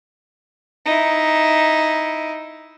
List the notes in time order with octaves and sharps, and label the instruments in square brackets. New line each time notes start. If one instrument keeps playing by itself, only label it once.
[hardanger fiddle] D#4 E4